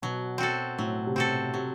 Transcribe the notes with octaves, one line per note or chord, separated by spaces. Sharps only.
B2 F#3
C4 F#4 A4
A2 F#3
C3
B2 C4 F#4 A4
C3 F#3